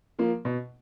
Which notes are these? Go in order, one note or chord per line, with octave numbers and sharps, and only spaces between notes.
F3 A#3
B2